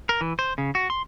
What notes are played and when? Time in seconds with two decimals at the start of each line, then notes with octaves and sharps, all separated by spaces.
0.09 A#4
0.21 E3
0.39 C5
0.58 C#3
0.75 F#4
0.90 C6